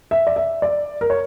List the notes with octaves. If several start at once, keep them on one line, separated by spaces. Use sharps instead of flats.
E5
D5
E5
D5
A#4
C#5